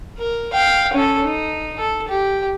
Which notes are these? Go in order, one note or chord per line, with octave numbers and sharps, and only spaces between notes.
A#4
F5 G5
C#4 A4
D#4
A4
G4